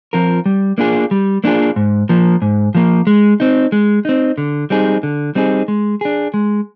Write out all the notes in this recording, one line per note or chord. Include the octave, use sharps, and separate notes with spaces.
F3 C4 F4 A#4
G3
A#3 D4 F4 G#4
G3
A#3 D4 F4 G#4
G#2
F3 A#3
G#2
F3 A#3
G#3
C4 D#4
G#3
C4 D#4
D3
G3 C4 D#4 G#4
D3
G3 C4 D#4 G#4
G#3
D4 G#4
G#3